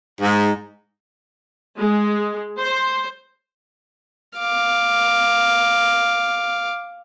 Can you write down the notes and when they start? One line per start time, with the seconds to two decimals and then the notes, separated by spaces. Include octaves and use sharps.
0.22 G#2
1.79 G#3
2.59 C5
4.39 F5 D6